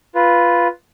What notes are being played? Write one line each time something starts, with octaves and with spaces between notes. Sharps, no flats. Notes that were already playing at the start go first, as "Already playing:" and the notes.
F4 B4